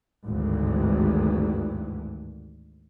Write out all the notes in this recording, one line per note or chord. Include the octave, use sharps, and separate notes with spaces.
G#1 D2 G2 E3